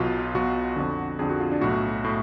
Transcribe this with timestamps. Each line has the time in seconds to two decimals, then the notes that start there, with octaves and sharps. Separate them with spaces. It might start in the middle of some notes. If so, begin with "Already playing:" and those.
Already playing: B1 B2 F4
0.35 B1 B2 F#4
0.76 F2 D3
1.19 F2 D3 G#4
1.30 F#4
1.40 F4
1.52 D4
1.61 B1 A2 F#4
2.04 A2